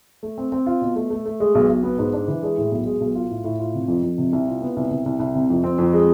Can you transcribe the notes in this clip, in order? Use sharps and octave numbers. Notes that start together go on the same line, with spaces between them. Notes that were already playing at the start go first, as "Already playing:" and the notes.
A3
C4
C4
F4
B2
A3
A3
A3
G#3
B1
B1
B3
G#2
D4
E3
G#3
A2
B1
G#3
B1
F4
A2
A2
F4
C3
F2
F2
C3
C2
F4
B3
C2
C2
C2
C2
C3
F2
C4
F2
G#3